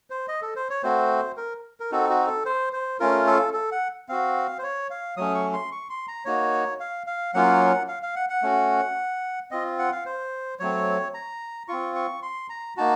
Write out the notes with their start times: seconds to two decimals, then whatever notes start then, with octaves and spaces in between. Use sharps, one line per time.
0.10 C5
0.28 D#5
0.42 A4
0.56 C5
0.70 C#5
0.83 A3 C4 F#4 C5
1.37 A#4
1.80 A#4
1.92 C4 D#4 F#4 A4
2.10 F#4
2.27 A4
2.46 C5
2.73 C5
3.00 A3 C#4 F4 A#4
3.27 A4
3.54 A4
3.72 F#5
4.09 C4 F#4 F5
4.59 C5
4.63 C#5
4.90 F5
5.17 F#3 A3 C#4 D#6
5.35 C#6
5.53 C6
5.72 C#6
5.90 C6
6.08 A#5
6.25 A#3 D#4 F#4 C#5
6.80 F5
7.07 F5
7.34 F#3 A#3 C#4 F4 F#5
7.88 F5
8.03 F5
8.16 F#5
8.30 F#5
8.42 A3 C#4 F#4
9.51 C4 F4 D#5
9.79 F#5
9.92 F5
10.06 C5
10.59 F#3 A3 C4 C#5
11.14 A#5
11.68 C4 F4 C#6
11.95 C#6
12.22 C6
12.49 A#5
12.77 A#3 D#4 F#4 A5